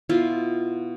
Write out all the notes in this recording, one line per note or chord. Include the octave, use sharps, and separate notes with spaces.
B2 E4 F4